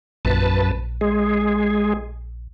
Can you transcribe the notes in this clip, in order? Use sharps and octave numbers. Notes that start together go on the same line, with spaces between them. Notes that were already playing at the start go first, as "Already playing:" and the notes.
A#1 F#2 B4 A5
G#3 G#4